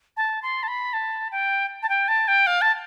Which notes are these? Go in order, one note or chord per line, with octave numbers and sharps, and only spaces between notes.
A5
C6
A5
B5
A5
G5
A5
G5
A5
G5
F5
A5